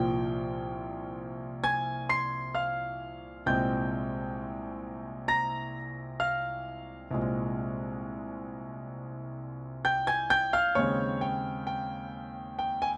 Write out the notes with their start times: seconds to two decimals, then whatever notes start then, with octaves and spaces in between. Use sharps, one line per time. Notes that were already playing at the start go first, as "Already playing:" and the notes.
Already playing: C2 A#2 F3 G5
1.64 G#5 G#6
2.09 C6 C7
2.55 F5 F6
3.46 C2 A#2 G#3 C4 G5 G6
5.28 A#5 A#6
6.20 F5 F6
7.11 C2 A#2 G#3 C4
9.85 G5 G6
10.07 G#5 G#6
10.30 G5 G6
10.53 F5 F6
10.75 D#2 C#3 G#3 C4 C#5 C#6
11.21 G5
11.67 G5
12.59 G5
12.82 G#5